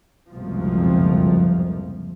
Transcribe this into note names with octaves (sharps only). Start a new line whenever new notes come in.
F#1 C2 F2 G#2 B2 F3